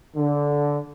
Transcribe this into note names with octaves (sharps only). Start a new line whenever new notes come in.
D3